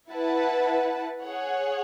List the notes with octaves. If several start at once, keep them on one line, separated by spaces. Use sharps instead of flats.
E4 B4 F#5 A5
G#4 C#5 F#5